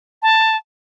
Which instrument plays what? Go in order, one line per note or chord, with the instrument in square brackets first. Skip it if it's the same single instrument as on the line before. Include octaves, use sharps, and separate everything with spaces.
[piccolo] A5